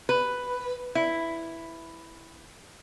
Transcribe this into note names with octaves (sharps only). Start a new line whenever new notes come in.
B4
E4